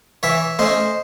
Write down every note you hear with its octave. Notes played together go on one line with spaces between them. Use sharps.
E3 C#5 E5
A3 C#4 C5 D#5